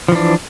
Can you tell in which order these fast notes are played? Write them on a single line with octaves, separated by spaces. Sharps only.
F3 E3 D4